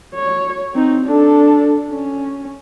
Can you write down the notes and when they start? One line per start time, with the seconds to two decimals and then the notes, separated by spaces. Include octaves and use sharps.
0.14 C#5
0.74 C4 D#4
1.05 D4 A4
1.91 C#4